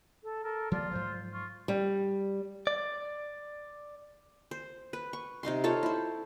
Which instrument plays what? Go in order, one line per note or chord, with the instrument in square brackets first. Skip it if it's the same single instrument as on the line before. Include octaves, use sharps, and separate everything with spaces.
[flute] A4
[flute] A4 [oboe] A#4
[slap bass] F3 G#3 A#3 [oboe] F4 [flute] D5
[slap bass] G#2 F3 F#3 [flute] C5
[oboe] F4 [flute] C#6
[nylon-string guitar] G3
[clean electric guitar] D5
[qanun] C5
B4
C#6
C3 D#4 F5 C6
F4 A4 C#5 A5
E4 C5